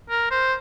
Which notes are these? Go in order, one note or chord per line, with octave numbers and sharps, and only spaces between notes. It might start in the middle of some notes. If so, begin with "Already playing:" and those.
A#4
C5